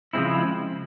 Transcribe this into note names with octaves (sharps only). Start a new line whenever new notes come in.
C#3 F3 G#3 C4 E4